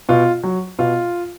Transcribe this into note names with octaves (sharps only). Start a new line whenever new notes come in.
B2 F4
F#3
B2 F4